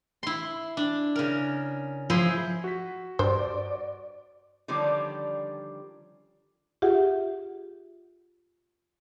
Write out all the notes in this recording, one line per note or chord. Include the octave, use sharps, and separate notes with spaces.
E4 C6
D4
C#3 A#4
F3 E4 G#4 C5
F#4 B6
G2 C5 D5
D3 D#3 F3 G3 C#4 D4
F4 G4 G#4 E5 F#5